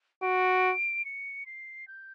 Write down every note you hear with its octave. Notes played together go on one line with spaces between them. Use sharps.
F#4 D7
C#7
C7
G6